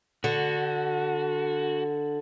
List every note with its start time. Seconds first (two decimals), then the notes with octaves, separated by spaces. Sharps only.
0.24 D3 F#4